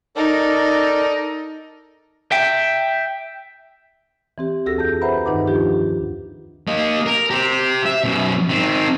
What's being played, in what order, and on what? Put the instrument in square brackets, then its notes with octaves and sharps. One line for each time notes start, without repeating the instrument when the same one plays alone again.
[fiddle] D#4 [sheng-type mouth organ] A4 A#4 D5
[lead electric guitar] E5 G5
[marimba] E3 C4 G4
D2 F#4 G#4 A4 E6 A#6
F2 G#4 G6
B4 C5 E5 F#5 A#5 B5
G2 D#3 D#4 B4 F#5 D6
F3 D4 F4 G4
[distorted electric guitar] A#3 D#5
A#4
G4 C5
E5
F#2 B2
D#3 C4